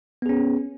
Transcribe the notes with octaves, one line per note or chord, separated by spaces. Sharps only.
B3 C#4 G#4